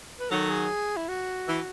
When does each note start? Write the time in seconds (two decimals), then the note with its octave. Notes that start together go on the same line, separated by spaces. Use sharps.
0.20 B4
0.30 D#3 F#3 A4
0.49 G#4
0.97 E4
1.08 F#4
1.47 E3